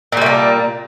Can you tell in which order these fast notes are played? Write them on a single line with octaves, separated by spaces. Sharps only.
A#2 G3 A3 A#3